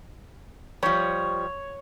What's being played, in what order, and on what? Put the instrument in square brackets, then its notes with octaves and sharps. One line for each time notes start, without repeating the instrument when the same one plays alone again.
[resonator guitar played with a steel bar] F3 G3 [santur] C#5